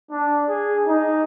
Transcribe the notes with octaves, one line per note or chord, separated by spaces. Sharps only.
D4
G#4
D#4